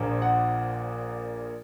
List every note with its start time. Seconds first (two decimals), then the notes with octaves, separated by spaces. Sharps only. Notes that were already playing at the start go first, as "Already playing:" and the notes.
Already playing: A#1 A#2 F3 A#3
0.22 F#5